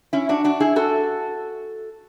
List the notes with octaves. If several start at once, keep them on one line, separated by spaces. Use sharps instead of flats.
C#4 E4
D4 F#4
D4 F#4
E4 G#4
F#4 A4